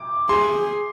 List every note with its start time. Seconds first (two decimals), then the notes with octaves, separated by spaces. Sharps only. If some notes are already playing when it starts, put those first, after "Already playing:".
Already playing: D6
0.29 G#4 C6